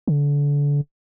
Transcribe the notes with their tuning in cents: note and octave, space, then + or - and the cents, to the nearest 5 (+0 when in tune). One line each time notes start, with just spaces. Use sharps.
D3 -30